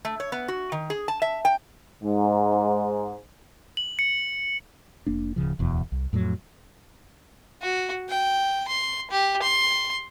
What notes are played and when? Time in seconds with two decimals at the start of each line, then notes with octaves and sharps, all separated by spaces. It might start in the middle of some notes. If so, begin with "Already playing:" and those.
0.05 A3
0.20 C#5
0.32 B3
0.48 F#4
0.72 D#3
0.90 G#4
1.08 A5
1.22 E5
1.45 G5
2.03 G#2
3.77 F#7
3.99 C#7
5.07 F1 A#3 D4
5.36 D1 B1 C#3 F3
5.59 D1 E2 B2
5.92 C2
6.13 F2 A2 D3 F#3
7.62 F#4
8.09 G5
8.68 C6
9.10 G4
9.42 C6